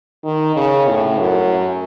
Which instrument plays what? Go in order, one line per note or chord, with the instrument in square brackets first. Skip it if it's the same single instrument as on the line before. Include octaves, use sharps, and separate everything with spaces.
[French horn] D#3
C#3
A2
F#2